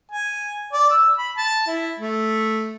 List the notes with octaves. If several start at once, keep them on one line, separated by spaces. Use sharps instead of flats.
G#5
D5
E6
B5
A5
E4
A3